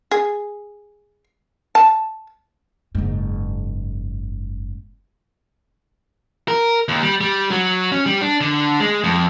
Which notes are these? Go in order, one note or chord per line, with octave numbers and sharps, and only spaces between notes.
G#4
A5
F#1 G#2
A#4
D#2
G3
G3
F#3
C#4
G3
D4
D3
G#3
F2